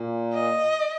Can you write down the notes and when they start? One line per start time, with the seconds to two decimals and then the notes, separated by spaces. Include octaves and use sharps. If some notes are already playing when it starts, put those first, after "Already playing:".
Already playing: A#2
0.34 D#5